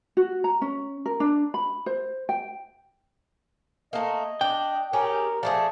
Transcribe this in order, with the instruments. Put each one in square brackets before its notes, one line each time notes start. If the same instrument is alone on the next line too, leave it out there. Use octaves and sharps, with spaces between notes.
[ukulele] F#4
A#5
C#4
A#4
D4
B5
C5
G5
[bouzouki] A3 A#3 [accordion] D#5
[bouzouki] D4 [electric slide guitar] G5
[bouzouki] C#4 G4 G#4 [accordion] A#4
[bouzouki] F3 A3 G#4 [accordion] D5 A5